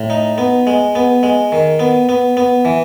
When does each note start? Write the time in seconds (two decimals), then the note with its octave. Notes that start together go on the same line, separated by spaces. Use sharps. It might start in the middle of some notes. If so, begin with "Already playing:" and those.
Already playing: A2
0.10 D#4
0.38 B3
0.67 G#3
0.95 B3
1.23 G#3
1.52 D#3
1.79 B3
2.09 B3
2.37 B3
2.65 E3